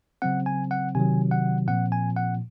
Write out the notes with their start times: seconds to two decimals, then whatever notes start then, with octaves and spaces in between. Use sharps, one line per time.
0.22 C#3 F#3 C4 F#5
0.46 G#5
0.71 F#5
0.95 C3 D#3 F#3 G#5
1.31 F#5
1.68 A#2 F3 C4 F#5
1.92 G#5
2.16 F#5